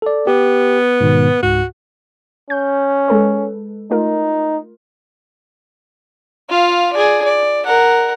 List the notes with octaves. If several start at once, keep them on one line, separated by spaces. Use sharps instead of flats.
A4 D5
B3 G4
G#2 B2 D#3
C#2 G#2 F#4
C#4 G6
G#3 A4 B4
A3 D#4 F4 A#4
F4 F5
G#4 D5
D5
A#4 F#5